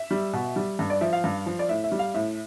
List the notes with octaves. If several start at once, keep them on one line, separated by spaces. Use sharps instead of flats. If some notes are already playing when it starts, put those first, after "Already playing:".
Already playing: E5
G3
B2
G3
G2
D5
F3 E5
F5
G2
F3
D5
A2 E5
E5
G3
F5
A2 E5